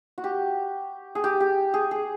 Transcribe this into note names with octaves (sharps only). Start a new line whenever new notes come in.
F#4
G4
G#4
G4
G4
G#4
G#4